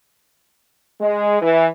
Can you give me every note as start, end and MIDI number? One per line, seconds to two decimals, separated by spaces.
1.00 1.40 56
1.41 1.65 52